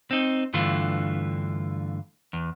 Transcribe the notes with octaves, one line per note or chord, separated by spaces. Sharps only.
C4 D#4
G2 D3 E3 A3 F4
E2